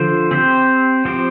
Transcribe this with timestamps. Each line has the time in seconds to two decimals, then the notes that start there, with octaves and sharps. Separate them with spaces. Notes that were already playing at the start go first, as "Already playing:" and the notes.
Already playing: D3 F3 D4 F4 C5
0.31 C4 G4 C5
1.05 F3 C4 G4